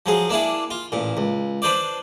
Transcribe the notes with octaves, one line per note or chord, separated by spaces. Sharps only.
F3 F#3 G#4
A#3 D4 E4 G#4
F4
A1 A#2
C#2
D4 B4 C5 D5